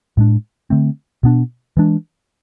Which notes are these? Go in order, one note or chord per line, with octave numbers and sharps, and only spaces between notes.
A2 G#3 D4
D3 A3 C4
B2 B3 D4
E3 G#3 D4